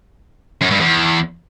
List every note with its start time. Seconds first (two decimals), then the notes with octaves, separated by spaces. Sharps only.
0.61 F#2
0.71 G2
0.80 E2